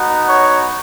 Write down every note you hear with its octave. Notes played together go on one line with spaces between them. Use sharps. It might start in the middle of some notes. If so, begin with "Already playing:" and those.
Already playing: B3 D#4 F#4
C#5